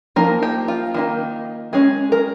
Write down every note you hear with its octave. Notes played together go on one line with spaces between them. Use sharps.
F3 A#3 D#4 A#4
G4
F4
D#3 A#3 D#4
G#3 C#4 G#4
A#4